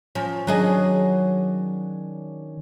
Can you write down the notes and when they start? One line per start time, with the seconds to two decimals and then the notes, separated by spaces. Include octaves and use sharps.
0.15 F3 C#4
0.47 D#3 F#3 C#4 D4 G#4 C#5 D#5